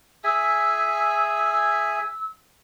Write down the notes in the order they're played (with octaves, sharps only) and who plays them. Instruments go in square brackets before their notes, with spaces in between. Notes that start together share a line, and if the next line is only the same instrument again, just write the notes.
[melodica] G#4 E5 G#5 [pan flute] E6